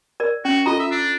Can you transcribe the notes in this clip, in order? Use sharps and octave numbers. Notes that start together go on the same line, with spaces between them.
A#4 D5
C#4 F#4
F4 A4 D#5 A#5
E5
D4